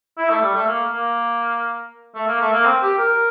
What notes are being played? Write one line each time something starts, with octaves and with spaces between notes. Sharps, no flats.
E4
A3
G3
A3
A#3
A#3
A3
A#3
A3
A#3
C4
G4
A#4